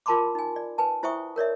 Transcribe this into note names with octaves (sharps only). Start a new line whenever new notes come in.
F4 A#4 A5 B5 C6 D6
D#4 G#5
D5
B4 G#5 A5
E4 C5 E5 G5 C#6 D#6
A#4 C#5 D5 E5